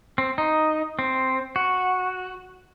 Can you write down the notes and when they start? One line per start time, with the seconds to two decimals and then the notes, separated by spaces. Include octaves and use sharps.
0.18 C4
0.38 D#4
0.99 C4
1.56 F#4